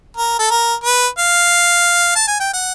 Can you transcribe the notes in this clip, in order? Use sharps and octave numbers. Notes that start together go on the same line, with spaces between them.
A#4
A4
A#4
B4
F5
A5
G#5
G5
F#5